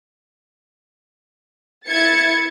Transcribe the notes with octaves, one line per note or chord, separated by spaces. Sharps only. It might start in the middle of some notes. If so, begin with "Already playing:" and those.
E4 G#6 A6 C#7